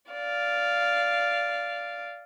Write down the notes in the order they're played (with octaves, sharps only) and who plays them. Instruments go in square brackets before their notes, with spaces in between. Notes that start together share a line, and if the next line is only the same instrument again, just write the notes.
[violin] D5 F5